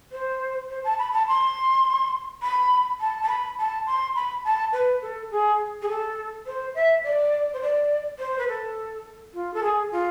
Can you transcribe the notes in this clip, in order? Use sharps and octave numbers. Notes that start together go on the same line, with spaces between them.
C5
C5
A5
B5
A5
C6
B5
A5
A5
B5
A5
C6
B5
A5
B4
A4
G#4
G#4
A4
C5
E5
D5
C5
D5
C5
B4
A4
F4
A4
G#4
F4